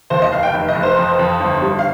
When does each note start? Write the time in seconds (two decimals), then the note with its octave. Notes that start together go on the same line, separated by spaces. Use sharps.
0.10 D#2 C5
0.22 D#5
0.32 F1 F5
0.43 G5
0.54 F1
0.68 D#5
0.75 F1
0.83 C5
0.97 F2
1.19 F2
1.40 G1
1.62 G3
1.79 F5